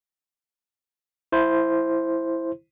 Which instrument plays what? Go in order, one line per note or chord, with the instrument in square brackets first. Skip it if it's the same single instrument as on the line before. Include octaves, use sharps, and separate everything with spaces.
[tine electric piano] E4 C5